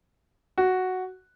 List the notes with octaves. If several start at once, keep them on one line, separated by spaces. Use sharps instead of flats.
F#4